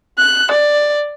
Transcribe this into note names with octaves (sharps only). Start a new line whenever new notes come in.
F#6
D5